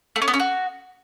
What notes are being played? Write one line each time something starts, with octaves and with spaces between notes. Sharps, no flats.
A3
C#4
B3
C#4
F#4